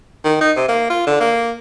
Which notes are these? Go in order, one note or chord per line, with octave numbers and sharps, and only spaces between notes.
D#3
D#4
C3
A#3
F4
D3
A#3